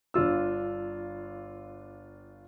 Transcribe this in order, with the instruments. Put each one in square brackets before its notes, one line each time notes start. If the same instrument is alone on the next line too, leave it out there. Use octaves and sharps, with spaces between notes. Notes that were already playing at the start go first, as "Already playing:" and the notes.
[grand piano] G1 D4 F4 E6